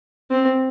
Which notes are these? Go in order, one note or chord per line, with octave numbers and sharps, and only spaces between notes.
C4